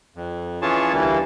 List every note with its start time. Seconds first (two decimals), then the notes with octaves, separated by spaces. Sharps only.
0.16 F2
0.62 E3 C#4 F4 G#4 C#5 A5
0.93 D2 E3 G3 A#3